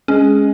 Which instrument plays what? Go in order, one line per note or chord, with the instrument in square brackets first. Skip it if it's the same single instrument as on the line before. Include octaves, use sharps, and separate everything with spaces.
[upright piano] G#3 [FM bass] C#4